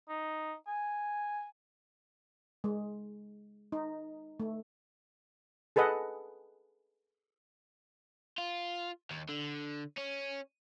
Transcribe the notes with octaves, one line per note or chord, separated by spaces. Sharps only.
D#4
G#5
G#3
D#4
A3
G#4 A4 B4 D#5 F#5
F4
D#2
D3
C#4